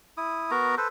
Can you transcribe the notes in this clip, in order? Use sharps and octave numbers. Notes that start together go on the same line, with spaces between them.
E4 D#6
B3 F#4 A#4 A#5
A4 B4 C5